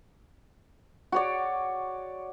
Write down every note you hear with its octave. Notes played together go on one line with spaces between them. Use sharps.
F#4 C#5 D5